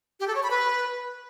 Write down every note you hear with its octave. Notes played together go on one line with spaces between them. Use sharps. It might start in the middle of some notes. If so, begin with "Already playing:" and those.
G4
A4
C#5
B5
B4